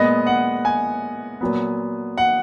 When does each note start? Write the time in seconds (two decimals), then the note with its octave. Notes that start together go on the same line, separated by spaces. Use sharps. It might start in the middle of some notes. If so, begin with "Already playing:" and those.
Already playing: A#2 G#3 B3 D#5
0.26 F#5
0.65 G#5
1.41 A#2 F#3 B3
2.18 F#5